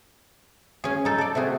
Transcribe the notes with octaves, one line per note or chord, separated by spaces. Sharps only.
C#4 G#4
D#4 A4
A4 D5
C3 A3 F#4 G#4